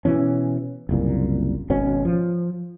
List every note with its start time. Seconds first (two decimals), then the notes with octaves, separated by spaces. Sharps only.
0.05 B2 E3 C#4
0.89 F#1 C2 A#2
1.70 G#1 B2 C#4
2.05 F3